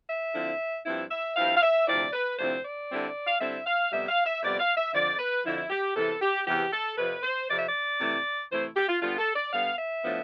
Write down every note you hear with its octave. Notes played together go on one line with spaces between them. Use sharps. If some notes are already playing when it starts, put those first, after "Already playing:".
E5
D3 F3 C4 E4
G2 F3 C4 E4
E5
G2 F3 C4 E4 F5
F5
E5
D2 C3 F3 C4 E4 D5
B4
D2 C3 F3 C4 E4 C5
D5
D3 G3 C4 E4
F5
D3 G3 C4 E4 E5
F5
F2 C3 G3 B3 E5
F5
E5
F2 C3 G3 B3 D5
F5
E5
F2 D3 F3 D5
B4
F2 D3 F3 E4
G4
E2 C3 E3 B3 A4
G4
E2 C3 E3 B3 G4
A4
F2 C3 F3 B4
C5
F2 C3 F3 D5
E5
D5
C3 E3 A3 E4
C3 E3 A3 E4 C5
G4
F4
D3 G3 B3 F4
A4
D5
D3 G3 B3 F5
E5
A2 F3 B3 D4